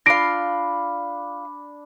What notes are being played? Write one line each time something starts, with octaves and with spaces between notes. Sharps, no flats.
D4 F4 F5 B5 A#6 D7